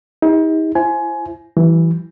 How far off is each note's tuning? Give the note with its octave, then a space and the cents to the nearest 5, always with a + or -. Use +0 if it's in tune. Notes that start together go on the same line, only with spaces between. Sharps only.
D#4 +40 G4 +40
E4 +30 C5 +15 G#5 +20
E3 +0 G3 -40